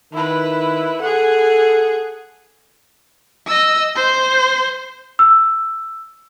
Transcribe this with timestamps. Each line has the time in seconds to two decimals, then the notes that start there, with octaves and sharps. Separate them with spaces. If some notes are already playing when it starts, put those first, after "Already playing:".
0.13 D#3 E4 B4
1.01 G#4 A4 F#5
3.47 D#5 E6
3.96 C5
5.19 E6